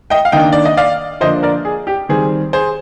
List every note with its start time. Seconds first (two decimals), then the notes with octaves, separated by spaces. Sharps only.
0.10 D#5 G5
0.25 F5
0.32 D#3 A#3 D4 D#5 G5
0.52 D5
0.65 D#5
0.77 D5 F5
1.21 D3 F3 A#3 D4 C5 D#5
1.43 A#4 D5
1.65 G#4
1.87 G4
2.09 D#3 G3 C4 G#4
2.53 G#4 C5